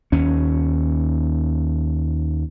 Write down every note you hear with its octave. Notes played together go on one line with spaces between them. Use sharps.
D#2 C#4